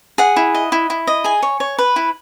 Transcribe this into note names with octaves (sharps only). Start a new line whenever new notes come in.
G#4 F#5
E4
D#5
E4
E4
D#5
G#4 G#5
C#5
C#5
B4
E4